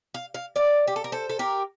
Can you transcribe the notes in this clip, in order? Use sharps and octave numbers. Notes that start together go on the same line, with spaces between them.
F5
F5
D5 F5
G4
A4
A#4
A4 C5
A4
G4 A#4